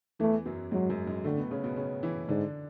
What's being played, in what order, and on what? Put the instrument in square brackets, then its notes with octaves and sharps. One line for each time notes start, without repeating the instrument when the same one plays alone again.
[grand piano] E2 E3 [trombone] A3
[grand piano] F#2 F#3
[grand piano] G#2 G#3 [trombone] F#3
[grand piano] F#2 F#3
G#2 G#3
[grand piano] A2 A3 [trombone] D3
[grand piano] B2 B3
C#3 C#4
B2 B3
C#3 C#4
E3 E4
[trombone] G#2 [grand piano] D3 D4